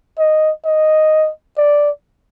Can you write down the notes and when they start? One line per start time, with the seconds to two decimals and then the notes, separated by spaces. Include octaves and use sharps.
0.19 D#5
0.65 D#5
1.58 D5